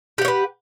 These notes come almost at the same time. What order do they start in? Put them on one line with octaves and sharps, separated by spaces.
G4 F#5 C#5 B4